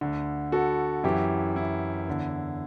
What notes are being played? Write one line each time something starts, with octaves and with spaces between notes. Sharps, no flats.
D2 D3
F#4 A4
F#2 E3 E4 G4
E4
E2 D3